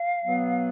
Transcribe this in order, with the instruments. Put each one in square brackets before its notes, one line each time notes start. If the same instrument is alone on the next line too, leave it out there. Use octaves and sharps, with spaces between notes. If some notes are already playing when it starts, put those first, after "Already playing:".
Already playing: [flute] F5
[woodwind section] B2 F#3 B3